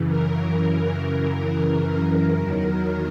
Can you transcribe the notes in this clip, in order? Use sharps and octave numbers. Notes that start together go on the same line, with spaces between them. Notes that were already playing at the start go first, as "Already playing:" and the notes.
Already playing: F#2 C#3 E3
A#4
A#4
A#4
E2 D#3 F#3